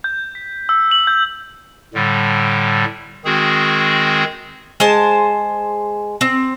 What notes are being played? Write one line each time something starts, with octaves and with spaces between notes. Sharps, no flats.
G6
B6
E6
F#7
G6
A2 D3 G3
D#3 G#3 C4 F#4 G#4
G#3 C5 A5
C4